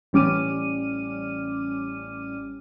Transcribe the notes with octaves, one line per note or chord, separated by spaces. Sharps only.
A1 G3 C#4 D6 F6 D#7